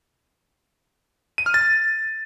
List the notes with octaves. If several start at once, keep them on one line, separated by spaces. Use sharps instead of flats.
D#7
F6
A6